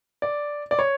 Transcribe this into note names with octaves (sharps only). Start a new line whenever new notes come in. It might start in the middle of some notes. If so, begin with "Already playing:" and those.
D5
D5
C#5